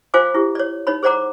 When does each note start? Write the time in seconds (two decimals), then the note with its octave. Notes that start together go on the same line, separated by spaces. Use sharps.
0.14 F4 C5 F5 G#5 D6
0.34 E4 G4
0.55 C#5 D5
0.87 D#4 C#5 B5
1.03 G#4 C5 D5 F#5 A#5 D6